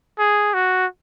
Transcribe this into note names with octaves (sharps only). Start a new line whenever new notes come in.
G#4
F#4